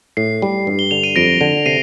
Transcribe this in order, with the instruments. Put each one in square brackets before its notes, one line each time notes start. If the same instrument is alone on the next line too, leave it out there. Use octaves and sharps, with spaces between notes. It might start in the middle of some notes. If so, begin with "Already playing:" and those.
[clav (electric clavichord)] A2 [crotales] C7
[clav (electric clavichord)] G3
G2
[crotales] G7
[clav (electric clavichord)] D3 [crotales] F7
[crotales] D#7
[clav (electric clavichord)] F2 [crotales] A#6 D7
[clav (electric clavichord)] D3
[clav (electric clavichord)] C3 [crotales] C7 D#7